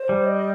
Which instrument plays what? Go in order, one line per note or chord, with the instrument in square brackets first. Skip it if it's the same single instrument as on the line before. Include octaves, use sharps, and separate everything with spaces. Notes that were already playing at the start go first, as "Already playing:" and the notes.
Already playing: [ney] C5
[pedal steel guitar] G3
[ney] D#5